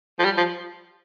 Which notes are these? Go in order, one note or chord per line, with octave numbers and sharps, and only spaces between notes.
F3
G3
F3